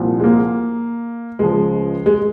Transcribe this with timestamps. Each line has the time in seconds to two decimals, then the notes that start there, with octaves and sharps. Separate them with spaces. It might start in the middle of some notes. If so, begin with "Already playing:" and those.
Already playing: C2 A#2 F3
0.20 G#3
0.24 A#3
1.39 C#2 C#3 F3 G#3
2.06 G#3